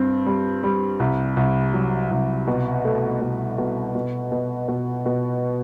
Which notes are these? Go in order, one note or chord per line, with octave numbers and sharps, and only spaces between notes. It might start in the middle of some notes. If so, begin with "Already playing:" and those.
Already playing: G2 C4
G3
G3
C2
C2
F#3
C2
B2
A3
B2
B2
B2
B2
B2
B2